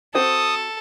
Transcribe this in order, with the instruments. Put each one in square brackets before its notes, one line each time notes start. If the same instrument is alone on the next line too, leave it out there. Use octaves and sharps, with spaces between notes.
[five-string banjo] C4 F#4 C5 [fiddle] A4 [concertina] D#6